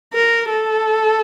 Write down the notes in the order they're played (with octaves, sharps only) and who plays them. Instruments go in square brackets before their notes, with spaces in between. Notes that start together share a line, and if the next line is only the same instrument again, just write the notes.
[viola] A#4
A4